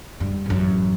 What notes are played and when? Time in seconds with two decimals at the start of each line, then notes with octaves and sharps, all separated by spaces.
0.20 G2
0.46 A1 F#2